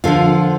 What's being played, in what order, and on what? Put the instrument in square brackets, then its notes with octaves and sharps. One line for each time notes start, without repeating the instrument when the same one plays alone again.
[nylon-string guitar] D3 F3 F4